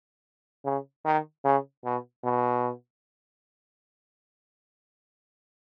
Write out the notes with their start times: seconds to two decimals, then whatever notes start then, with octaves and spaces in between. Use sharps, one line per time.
0.65 C#3
1.05 D#3
1.44 C#3
1.84 B2
2.23 B2